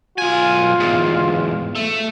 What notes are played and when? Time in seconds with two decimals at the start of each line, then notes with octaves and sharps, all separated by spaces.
0.18 B1 F4 G#5
0.80 E2 G#2
1.76 A3